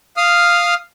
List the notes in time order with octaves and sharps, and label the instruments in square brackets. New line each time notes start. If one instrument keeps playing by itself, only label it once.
[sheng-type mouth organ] F5 D#6 F6